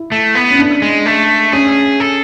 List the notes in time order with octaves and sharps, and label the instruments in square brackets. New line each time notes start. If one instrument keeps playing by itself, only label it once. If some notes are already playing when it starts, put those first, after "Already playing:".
Already playing: [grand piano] E4
[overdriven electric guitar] A3
B3
[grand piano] C#4
D4
[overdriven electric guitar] G#3
A3
[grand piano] C#4 [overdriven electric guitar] G#4
[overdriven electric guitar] A4